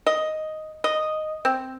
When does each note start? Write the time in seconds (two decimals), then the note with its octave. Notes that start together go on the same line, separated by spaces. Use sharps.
0.06 D#5
0.84 D#5
1.45 C4